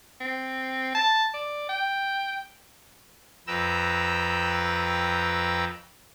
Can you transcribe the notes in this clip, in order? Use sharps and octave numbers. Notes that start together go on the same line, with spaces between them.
C4
A5
D5
G5
F2 B4 G5 A#5 E6